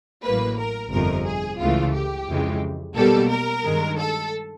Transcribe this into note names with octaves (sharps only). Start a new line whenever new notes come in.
A1 A2 F#3 A#3 B4
A#4
G1 F2 C3 F3 A#4
G#4
C#2 C#3 E3 A3 F4
G4
F2 C#3 E3 G#3
B1 B2 G3 A#3 A4
A#4
G2 D#3 G#3
A4